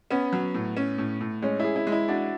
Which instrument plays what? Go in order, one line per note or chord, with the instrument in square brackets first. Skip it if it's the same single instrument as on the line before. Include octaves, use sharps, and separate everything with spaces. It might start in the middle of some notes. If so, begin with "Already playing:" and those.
[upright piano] B3 [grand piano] C#4
[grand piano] F#3
A2
C#4
A2
A2
[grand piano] G#3 [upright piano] C#4
[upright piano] E4 [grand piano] G#4
[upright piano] E4
[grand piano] G#3
[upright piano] E4
[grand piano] D4 [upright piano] F#4